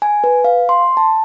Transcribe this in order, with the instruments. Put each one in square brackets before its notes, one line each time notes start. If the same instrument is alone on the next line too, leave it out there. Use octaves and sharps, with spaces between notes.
[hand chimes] G#5
B4
F5
C6
A5